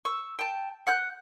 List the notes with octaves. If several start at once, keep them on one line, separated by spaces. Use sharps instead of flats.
C#6 E6
G5 A5
F#5 F#6 G6